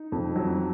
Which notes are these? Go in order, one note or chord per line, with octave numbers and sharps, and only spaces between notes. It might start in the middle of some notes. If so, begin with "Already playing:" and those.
Already playing: D#4
F2
F#3